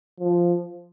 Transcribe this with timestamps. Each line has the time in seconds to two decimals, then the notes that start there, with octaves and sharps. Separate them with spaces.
0.20 F3